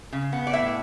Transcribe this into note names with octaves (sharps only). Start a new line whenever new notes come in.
C#3
B3
D5
A2 E5